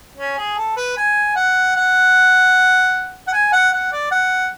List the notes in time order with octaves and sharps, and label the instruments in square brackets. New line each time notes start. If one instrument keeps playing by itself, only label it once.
[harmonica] C#4
G#4
A4
B4
G#5
F#5
F#5
F#5
G#5
F#5
F#5
D5
F#5